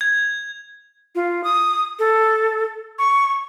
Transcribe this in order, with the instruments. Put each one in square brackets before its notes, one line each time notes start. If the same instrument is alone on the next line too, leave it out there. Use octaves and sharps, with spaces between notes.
[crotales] G#6
[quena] F4
D#6
A4
C#6